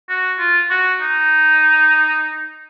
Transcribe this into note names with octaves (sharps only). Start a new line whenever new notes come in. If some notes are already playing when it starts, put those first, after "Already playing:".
F#4
F4
F#4
D#4